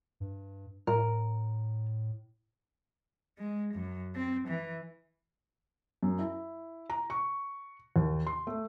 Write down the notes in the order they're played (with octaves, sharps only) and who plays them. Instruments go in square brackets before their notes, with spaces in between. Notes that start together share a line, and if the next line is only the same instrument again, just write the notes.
[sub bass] G2
[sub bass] A2 [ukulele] A#4
[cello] G#3
F#2
C4
E3
[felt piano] F#2
E4
A#5
C#6
D#2
C6
A3